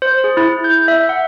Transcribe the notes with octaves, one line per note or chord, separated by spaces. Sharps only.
C5
G#4
E4
G6
E5
F#5